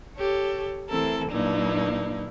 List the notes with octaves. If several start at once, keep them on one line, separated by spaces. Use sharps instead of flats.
G4 A4 C#5
E3 A3 C4 E4 A4 A#4
G2 A#2 F#3 A#3 D#4 E4